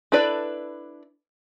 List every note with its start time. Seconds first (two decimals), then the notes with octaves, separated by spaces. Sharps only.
0.12 D4 E4 A4 B4 D5